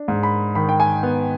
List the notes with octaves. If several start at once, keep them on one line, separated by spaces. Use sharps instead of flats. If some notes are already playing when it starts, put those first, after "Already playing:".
Already playing: D4
G#2
B5
D#3 B5
G5
G#5
B3